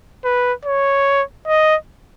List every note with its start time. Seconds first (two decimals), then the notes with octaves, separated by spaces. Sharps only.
0.24 B4
0.65 C#5
1.47 D#5